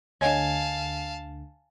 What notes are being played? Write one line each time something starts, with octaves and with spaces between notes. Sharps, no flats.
D2 D3 C#5 D#5 F5 G#5 A5